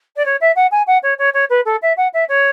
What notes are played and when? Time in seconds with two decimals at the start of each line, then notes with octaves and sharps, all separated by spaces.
0.16 D5
0.25 C#5
0.41 E5
0.56 F#5
0.71 G#5
0.87 F#5
1.03 C#5
1.18 C#5
1.34 C#5
1.49 B4
1.65 A4
1.82 E5
1.97 F#5
2.13 E5
2.28 C#5